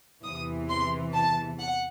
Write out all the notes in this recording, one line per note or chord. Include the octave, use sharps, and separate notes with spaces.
E2 C3 E3 D#6
C6
A5
F#5